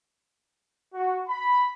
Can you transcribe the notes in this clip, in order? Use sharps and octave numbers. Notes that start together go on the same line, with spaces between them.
F#4
B5